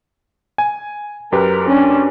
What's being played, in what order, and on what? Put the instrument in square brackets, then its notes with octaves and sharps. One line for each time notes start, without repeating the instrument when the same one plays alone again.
[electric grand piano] G#5
[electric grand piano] F#2 G4 B4 [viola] A#4
[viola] C#4 D4